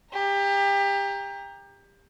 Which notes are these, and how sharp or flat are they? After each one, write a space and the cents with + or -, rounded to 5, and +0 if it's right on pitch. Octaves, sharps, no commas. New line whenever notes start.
G4 +25 A#5 +0